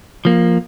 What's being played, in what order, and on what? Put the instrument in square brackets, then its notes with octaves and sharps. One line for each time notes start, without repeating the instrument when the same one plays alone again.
[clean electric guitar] F3 A#3